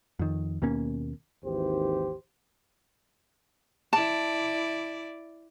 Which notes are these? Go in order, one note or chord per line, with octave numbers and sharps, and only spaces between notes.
F2 D#3
D#2 B2 A#3 C#4
G#1 D#2 E3 G4 C5
E4 D5 A5